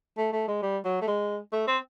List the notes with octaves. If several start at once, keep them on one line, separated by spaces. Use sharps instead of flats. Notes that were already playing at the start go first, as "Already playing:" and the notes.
A3
A3
G#3
G3
F#3
A3
G#3
A3
C4